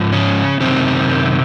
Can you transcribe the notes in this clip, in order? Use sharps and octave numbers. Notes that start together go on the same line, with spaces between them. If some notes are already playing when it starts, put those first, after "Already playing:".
Already playing: G#2 F3
C#3 C#4
F#2 C3 D#3 C4